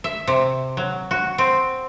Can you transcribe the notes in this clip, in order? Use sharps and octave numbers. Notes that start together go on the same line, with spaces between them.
E5
C3
F#3
F#4
C4